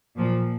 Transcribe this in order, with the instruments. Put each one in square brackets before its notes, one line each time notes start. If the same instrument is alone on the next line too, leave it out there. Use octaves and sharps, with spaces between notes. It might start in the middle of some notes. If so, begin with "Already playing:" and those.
[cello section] A#2 F3